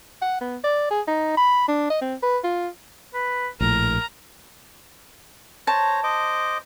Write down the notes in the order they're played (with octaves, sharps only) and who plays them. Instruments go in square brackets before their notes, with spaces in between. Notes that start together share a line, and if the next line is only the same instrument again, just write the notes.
[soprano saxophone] F#5
B3
D5
G#4
D#4
B5
D4
D#5
C4
B4
F4
[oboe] B4
[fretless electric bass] A#1 A2 [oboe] A#4 [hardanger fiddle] A#5
[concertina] C5 C#5 A#5 [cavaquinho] A5
[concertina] C5 D#5 D6